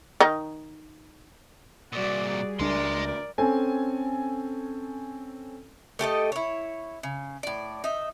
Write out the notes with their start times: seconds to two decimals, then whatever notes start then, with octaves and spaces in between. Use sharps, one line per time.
0.20 D#3 D#4
1.93 C2 A#2 G3 F#4 G#4 D5
2.60 C#2 D4 A#4 D5 D#5 C6
3.38 C4 C#4 A4 G#5
5.99 A3 G4 A4 D#5
6.32 E4 C#5
7.03 C#3
7.43 A2 D5
7.84 D#4 E5